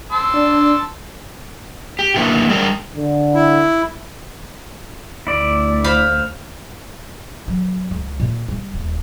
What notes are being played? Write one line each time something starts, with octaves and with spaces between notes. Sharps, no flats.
A5 C6 E6
D4
G4
A#2 D3 D#3 A#3 B3 E4
G3 G#3 D4 A#4 G5
D3
E4
D2 E4 D5
C5 F5 B5
F#3
C#2
A#2
G3
D#1